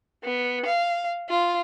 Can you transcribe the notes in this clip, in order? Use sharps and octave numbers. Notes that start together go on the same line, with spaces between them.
B3
F5
F4